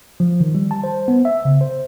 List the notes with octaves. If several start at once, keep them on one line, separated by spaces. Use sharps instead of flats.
F3
D#3
G3
A5
C5
B3
E5
C#3
C5